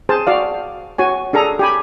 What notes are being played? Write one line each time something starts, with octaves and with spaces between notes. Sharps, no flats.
G#4 C5 A5
F#4 D5 F5
F#4 C#5 G#5
D4 G#4 A4 A#5
G4 G#5 B5